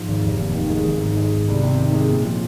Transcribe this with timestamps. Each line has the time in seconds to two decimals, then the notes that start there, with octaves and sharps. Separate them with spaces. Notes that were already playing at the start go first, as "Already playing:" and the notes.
Already playing: G#2 F3
0.08 G#1
0.24 F1
0.39 D#2
0.55 D#3
0.70 G#3
0.86 G#1
1.01 G#2
1.17 G#3
1.32 G#1
1.48 C2
1.63 C3
1.78 D#3
1.94 G#3
2.09 A#2
2.25 F3